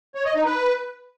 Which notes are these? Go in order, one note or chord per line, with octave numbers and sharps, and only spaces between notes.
C#5
D#5
D#4
B4